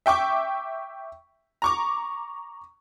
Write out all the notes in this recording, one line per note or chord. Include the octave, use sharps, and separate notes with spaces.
E5 G5 C#6 D6
A#5 C#6 D6